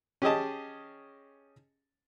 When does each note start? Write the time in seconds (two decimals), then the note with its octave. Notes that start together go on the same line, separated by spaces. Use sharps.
0.22 C#4 G4 G#4 D#5 A5